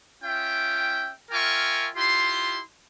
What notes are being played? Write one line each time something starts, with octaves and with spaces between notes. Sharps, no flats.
C#4 F4 E5 G5
F4 A#4 E5 G5 G#5 C#6
E4 F4 G4 C6